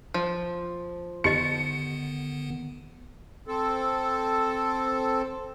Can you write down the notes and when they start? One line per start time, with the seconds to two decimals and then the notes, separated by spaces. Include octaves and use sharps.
0.14 F3
1.24 D3 D#3 B3 D#4 G4 D#5 C#7
3.48 C4 A4